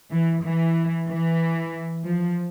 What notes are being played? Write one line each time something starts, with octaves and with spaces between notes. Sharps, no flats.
E3
E3
E3
F3